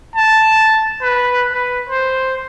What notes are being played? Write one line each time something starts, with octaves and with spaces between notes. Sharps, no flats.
A5
B4
B4
C5